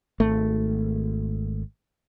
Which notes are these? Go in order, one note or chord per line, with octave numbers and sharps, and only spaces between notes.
G#1 A3